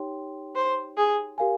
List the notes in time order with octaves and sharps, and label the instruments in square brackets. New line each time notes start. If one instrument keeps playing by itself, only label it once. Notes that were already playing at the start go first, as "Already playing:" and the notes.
Already playing: [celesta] D#4 G4 C#5 G5 C6
[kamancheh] C5
G#4
[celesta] G4 A#4 F5 G#5